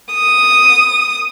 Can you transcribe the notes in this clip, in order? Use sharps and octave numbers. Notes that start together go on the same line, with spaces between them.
D#6